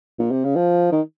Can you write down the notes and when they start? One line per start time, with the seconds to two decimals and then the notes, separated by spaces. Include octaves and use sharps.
0.19 A#2
0.31 C3
0.44 C#3
0.56 F3
0.92 D#3